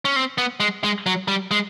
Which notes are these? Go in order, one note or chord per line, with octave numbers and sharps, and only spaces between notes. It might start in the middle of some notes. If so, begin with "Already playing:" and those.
C#4
C4
B3
G#3
G#3
F#3
G3
G#3